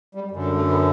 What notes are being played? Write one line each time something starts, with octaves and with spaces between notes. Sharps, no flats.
G3
F#2
D3
G3
A3
B3